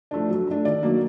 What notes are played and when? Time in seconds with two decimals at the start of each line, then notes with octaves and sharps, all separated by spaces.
0.11 F3 A3 D4
0.29 F#3
0.47 A3 D4
0.65 D#3 D5
0.83 F#3 A#3